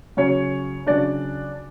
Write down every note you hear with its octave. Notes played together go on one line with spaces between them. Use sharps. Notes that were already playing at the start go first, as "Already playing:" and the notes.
C#3 F#3 C#4 C#5
C#3 F#3 C#4 D4 D5